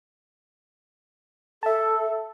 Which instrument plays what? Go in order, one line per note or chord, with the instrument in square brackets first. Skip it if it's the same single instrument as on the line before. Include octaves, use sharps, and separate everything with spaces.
[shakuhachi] A4 [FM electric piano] E5 A5